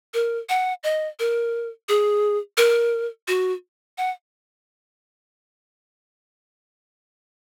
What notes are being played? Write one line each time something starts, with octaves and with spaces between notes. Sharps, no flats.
A#4
F#5
D#5
A#4
G#4
A#4
F#4
F#5